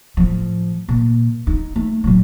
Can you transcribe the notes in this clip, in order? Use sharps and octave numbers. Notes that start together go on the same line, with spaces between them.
A2 F3
A#2
D#4
A3
A2 F#3